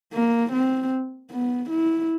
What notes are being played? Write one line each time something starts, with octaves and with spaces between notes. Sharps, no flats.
A#3
C4
B3
E4